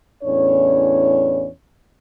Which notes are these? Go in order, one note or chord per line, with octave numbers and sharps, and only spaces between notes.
E2 A2 C#4 D4 C#5